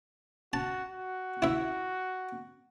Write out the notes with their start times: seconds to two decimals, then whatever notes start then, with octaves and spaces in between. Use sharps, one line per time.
0.53 F#4 A5
0.89 F#4
1.42 E4 E5